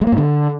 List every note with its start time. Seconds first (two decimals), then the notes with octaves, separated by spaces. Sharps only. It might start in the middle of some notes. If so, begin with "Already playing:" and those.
0.01 G#3
0.07 A#3
0.12 G#2
0.18 D3